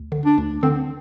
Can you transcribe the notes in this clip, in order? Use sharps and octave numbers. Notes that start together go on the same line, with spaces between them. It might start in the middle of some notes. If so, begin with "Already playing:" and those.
Already playing: D2
D3
D4
D2
D3 C4